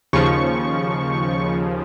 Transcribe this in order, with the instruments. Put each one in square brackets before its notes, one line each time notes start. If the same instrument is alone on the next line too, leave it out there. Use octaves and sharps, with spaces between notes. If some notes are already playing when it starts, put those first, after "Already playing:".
[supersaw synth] D#2 C#3 F3 C#6